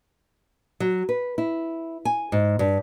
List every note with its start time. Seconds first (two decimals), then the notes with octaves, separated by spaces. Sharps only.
0.80 F#3
1.09 B4
1.38 E4
2.05 G#5
2.32 G#2
2.59 G2